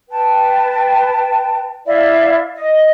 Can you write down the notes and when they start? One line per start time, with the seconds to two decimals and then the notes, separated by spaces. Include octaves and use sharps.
0.10 B4 G5 A5
1.87 E4 D5 E5 F5
2.56 D#5